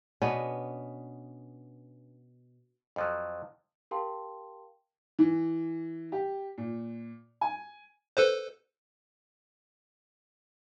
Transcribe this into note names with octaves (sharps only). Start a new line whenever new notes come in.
B2 B3 C#4 D4
F2 F3 F#3
G4 A#4 F5 G5 A5 C6
E3
G4
A#2
G#5
A4 B4 C5